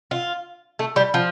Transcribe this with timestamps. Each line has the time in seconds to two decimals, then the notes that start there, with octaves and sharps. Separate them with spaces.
0.11 F4
0.79 A3
0.96 G3
1.14 F3